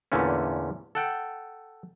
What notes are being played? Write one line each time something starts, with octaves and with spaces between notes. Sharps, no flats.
E2 A#2 D3 A3 C#4
A4 F#5 G5